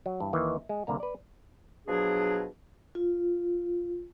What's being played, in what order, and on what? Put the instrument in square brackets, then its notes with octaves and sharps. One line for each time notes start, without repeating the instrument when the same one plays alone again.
[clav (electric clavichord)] F#3
G2 E3
D#2 D#3 E3
G#3
C2 D3 A#3 A#5
B4 D5
[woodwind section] B2 F3 F#3 D4 G#4
[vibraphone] F4